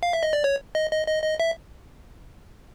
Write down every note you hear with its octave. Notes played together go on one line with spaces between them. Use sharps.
F5
E5
D#5
D5
C#5
D#5
D#5
D#5
D#5
E5